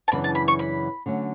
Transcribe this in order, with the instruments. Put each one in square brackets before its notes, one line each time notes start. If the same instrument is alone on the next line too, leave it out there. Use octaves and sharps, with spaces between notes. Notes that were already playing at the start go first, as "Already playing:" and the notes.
[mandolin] A5
[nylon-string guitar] F#2 C#3 E3 B3 D4 [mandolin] B5
[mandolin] A5
B5
C#6
B5
[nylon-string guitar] D3 F#3 A3 C#4